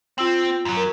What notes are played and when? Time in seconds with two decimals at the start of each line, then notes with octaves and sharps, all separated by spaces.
0.18 C4 F4 E6 F#7
0.65 F#2 F#3
0.77 A#4